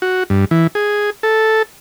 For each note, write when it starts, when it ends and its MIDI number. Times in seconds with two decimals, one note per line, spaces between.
0.02 0.23 66
0.30 0.45 43
0.51 0.67 52
0.75 1.10 68
1.23 1.62 69